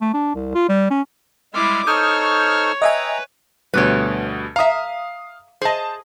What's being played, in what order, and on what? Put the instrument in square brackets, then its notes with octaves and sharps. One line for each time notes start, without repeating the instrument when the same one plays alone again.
[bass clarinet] A3
D4
C2
F4
G3
C#4
[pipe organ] G3 G#3 [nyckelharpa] E4 D6 [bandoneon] C6 E6 F6
[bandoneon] D#4 A4 [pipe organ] C5 C#6 F6 [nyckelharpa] C#5 [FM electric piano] D#6 G6
[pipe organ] B4 [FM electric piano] D#5 E5 G#5 [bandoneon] G5 A#5
[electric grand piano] D2 B2 G3 [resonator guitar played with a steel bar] B4 C#5
[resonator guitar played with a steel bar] E5 A#5 [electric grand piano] F5 D#6
[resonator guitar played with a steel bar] G#4 D#5 [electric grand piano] C5 A5